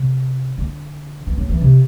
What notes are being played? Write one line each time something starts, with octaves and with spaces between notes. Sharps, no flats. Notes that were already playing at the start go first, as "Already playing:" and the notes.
Already playing: C3
D3
E3
F#3
E3
C3